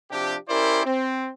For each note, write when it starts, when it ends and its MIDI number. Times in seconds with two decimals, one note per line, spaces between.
0.11 0.36 48
0.11 0.36 53
0.11 0.36 62
0.11 0.36 67
0.49 0.86 61
0.49 0.86 64
0.49 0.86 67
0.49 0.86 70
0.49 0.86 72
0.49 0.86 74
0.86 1.29 60